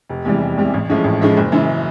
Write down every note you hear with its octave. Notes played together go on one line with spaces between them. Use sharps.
F1
E2 C3 E3 G3
F1
E2 C3 E3 G3
A1
A2 F3 G#3 C#4
A1
A2 F3 G#3 C#4
F#1
F#2 C#3 E3